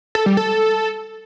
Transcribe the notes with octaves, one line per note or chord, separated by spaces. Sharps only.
A4
G3
A4